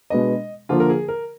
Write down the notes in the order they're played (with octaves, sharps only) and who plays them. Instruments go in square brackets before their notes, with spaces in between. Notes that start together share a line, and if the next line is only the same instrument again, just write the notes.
[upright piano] B2 G#3 B3 D4 [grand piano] D#5
[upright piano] D3 F3 A#3 [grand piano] F4
[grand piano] A#4
G#4
A#4